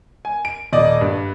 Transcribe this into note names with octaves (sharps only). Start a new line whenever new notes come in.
G#5
D7
D#1 D5 D#5 D#6
G2